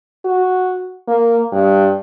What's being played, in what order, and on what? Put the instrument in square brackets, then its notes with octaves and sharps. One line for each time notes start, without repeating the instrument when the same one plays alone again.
[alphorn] F#4
A#3
G2